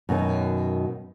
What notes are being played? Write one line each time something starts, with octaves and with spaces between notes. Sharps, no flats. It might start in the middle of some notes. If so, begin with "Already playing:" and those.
F#2 B2 D#3